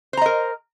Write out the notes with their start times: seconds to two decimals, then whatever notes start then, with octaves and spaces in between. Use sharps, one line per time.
0.13 C5
0.17 A#5
0.22 D#5
0.26 A#4